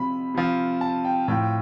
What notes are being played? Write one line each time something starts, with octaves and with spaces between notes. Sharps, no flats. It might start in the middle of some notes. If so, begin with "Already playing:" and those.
Already playing: C3 F3 B5
C3 F3
A5
G5
A2 F3 G5